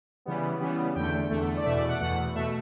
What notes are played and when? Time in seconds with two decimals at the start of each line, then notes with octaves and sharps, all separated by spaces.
0.25 C#3 E3 G3 B3
0.60 C#3 E3 G3 B3
0.96 E2 D3 A3 G5
1.30 E2 D3 A3
1.57 D5
1.65 E2 B2 A3 E5
1.77 D5
1.89 F#5
2.00 E2 B2 A3 F#5
2.35 B2 A3 E5